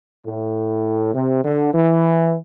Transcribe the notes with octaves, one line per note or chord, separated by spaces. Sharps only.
A2
C3
D3
E3